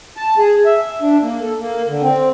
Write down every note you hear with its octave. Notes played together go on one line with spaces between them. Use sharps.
A5
G#4
E5
D4
A#3
A4
A#3
D3
C4